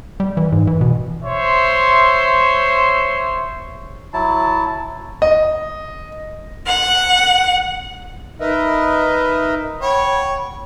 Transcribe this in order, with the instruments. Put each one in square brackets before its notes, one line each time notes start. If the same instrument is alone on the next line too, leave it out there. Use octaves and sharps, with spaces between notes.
[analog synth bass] G3
E3
G#2
E3
B2
[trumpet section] C5 C#5 E5 C6
[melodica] F#3 E4 A5
[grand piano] D#5
[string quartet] F#5
[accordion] D#4 A#4 B4 D#5 E5
[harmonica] C#5 [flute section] F#5 G5 B5